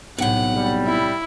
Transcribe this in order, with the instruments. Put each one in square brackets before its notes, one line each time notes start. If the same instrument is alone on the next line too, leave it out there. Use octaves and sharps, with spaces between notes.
[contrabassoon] B1 [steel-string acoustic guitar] A2 C3 [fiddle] F#5
[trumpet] G3
[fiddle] E4